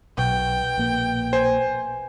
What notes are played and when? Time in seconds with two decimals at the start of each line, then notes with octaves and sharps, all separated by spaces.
0.18 B1 B2 G5
0.78 A#1 A#3
1.33 C5 G#5